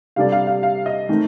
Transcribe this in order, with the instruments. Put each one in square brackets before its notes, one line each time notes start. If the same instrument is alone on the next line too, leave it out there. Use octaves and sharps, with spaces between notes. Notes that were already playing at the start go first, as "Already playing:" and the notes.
[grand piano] C3 G3 D4 A4 D5 [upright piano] F5
[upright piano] F5
F5
F5
D#5
[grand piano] D#3 A3 C4